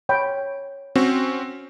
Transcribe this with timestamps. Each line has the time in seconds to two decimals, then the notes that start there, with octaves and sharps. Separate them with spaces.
0.09 C#5 G5 B5
0.96 C4 C#4 F#4